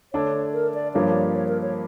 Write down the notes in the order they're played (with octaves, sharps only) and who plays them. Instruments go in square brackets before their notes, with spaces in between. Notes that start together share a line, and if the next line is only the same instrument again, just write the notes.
[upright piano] D3 A3 D4 A4 [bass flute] C#5
[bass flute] A#4
D5
[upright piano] G2 F3 A#3 D4 [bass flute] C#5
[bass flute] C#5
A#4
C#5